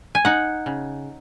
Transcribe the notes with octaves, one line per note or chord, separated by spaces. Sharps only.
G#5
D#4 F#5
C#3